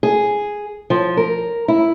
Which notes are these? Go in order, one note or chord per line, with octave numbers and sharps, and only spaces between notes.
G#4
F3
A#4
E4